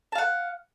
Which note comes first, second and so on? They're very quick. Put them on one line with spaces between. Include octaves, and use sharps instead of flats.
A5 F5 F#5